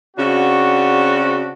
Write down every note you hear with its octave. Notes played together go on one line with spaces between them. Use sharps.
C#3 C4 D4 F#4